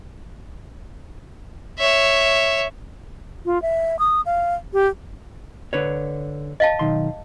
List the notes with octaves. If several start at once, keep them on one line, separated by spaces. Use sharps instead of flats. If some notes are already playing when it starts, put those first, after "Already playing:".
C#5 E5
F4
E5
D#6
F5
G4
D3 B4 C#5
D#5 F5 A5
B1 D#3 C6